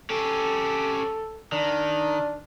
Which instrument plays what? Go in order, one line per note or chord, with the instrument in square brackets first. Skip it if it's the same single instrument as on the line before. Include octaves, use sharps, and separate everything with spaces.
[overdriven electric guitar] C#4 G4 [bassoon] A4
[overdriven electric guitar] D#3 [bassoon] D4